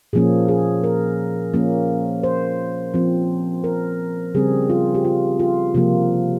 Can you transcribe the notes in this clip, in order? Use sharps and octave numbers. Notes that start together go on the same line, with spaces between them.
A#2 F3 A#3 C#4 G#4
G#4
A#4
F3 A#3 C#4
C5
F3 C4
A#4
C#3 G3 C4 G#4
F4
G4
F4
F4
C3 F3 A#3 F4